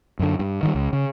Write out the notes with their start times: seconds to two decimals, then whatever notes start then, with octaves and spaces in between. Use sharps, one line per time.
0.19 F#2 D3
0.39 G2
0.63 D#3 E3 G3
0.75 C#2
0.93 C#3